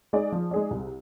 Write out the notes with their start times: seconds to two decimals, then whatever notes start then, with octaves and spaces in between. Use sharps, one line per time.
0.13 G#3 D#4 G#4 D5
0.32 F3
0.51 G#3 D#4 G#4 D5
0.71 C2